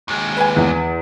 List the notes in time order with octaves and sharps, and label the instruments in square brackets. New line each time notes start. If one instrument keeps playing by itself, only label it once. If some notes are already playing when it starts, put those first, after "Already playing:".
[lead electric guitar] D#2 G#3
[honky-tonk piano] B4 G#5
[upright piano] E2